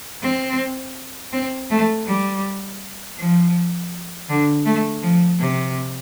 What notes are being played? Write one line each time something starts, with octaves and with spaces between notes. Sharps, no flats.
C4
C4
A3
G3
F3
D3
A3
F3
C3